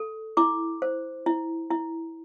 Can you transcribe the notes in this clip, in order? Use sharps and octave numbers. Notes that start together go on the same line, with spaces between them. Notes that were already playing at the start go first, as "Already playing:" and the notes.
Already playing: A4
E4 D6
C5
E4
E4